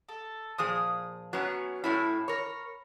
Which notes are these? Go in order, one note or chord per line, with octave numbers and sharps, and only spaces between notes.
A4
A#2 F3 G#4 D#6
F#3 B3 C#4
A2 C#4 E4 B5
A#4 C#5